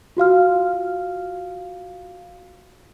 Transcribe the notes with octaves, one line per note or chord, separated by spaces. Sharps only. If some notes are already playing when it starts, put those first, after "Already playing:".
F4 F#4 F5 F6